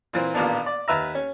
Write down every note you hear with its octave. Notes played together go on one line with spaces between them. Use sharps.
A#2 E3 C4
A1 A#2 D#3 A#3 B3 D4
D5
D#2 B4 E5 A#5
C#4